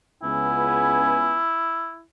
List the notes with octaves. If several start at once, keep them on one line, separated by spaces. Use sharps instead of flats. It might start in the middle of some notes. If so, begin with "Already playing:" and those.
C#2 B3 E4 G#5